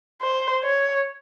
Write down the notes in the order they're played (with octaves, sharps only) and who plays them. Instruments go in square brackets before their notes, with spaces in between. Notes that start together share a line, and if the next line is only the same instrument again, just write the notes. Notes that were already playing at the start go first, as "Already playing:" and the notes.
[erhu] C5
C#5